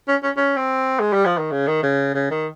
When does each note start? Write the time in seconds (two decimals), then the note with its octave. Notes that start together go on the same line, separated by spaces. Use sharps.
0.08 C#4
0.23 C#4
0.37 C#4
0.56 C4
0.99 G#3
1.13 G3
1.25 F3
1.38 D#3
1.51 C#3
1.67 D#3
1.83 C#3
2.14 C#3
2.30 D#3